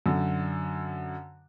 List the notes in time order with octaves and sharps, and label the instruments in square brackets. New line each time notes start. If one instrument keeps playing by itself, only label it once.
[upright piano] F#2 D3